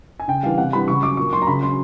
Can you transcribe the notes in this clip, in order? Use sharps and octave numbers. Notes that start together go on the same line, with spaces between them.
G#5
C#3 G5
E3 G3 F5
C3 F#5
E3 G3 B5
C#3 C#6
F#3 D6
A#2 C#6
F#3 C6
A#5
C#3 B5
F#3 C6